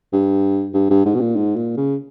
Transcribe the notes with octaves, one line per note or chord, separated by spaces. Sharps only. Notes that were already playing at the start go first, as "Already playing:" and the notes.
G2
G2
G2
G#2
B2
A#2
G#2
A#2
C#3